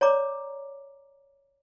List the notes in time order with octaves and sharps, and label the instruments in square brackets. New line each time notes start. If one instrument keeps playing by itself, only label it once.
[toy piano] C#5 D5 A#5 D6